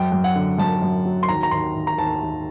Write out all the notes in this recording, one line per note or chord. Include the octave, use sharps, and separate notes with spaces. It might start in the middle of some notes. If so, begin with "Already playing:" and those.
Already playing: F#2 G5
F#2
F#5
D3
F#2 A5
F#2
F#3
C6
D#2 A#5
A#5
D#2 C6
D#2
A#5
D#2 A5
D#2